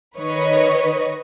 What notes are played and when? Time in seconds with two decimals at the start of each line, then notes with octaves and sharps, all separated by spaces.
0.17 D#3 B4 C#5 D#5